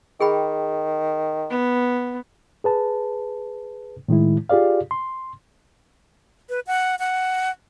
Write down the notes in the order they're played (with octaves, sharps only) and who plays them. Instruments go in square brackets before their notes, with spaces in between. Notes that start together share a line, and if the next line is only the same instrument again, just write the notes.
[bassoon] D#3 [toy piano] G#4 G5 B5
[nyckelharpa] B3
[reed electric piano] G#4 B4 A5
A2 D#3 G#3 E4
F4 G4 G#4 D5 F5
C6
[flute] B4
F#5
F#5